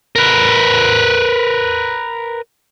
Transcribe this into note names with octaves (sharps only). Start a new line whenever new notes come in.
A#4 B4